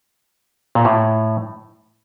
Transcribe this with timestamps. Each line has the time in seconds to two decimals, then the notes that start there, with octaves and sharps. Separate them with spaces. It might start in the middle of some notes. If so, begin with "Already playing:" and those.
0.75 A#2
0.85 A2